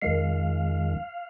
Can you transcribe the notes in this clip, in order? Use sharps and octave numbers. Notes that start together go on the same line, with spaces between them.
F2 D#3 G#3 F5